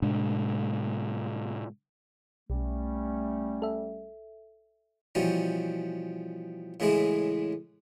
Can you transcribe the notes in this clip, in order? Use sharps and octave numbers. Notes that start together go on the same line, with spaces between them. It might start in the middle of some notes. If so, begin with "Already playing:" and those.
A2 C3 G#3 D4
B1 G3 A3 C#4
A4 E5
B2 E3 F3 G3 C#4
A2 C#3 E3 G#3 E4 G#4